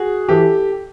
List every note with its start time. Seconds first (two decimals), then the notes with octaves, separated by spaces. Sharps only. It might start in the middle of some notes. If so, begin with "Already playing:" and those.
Already playing: F#4 G#4
0.29 E3 G4 A4